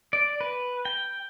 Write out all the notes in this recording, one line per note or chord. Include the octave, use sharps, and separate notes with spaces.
D5
B4
G5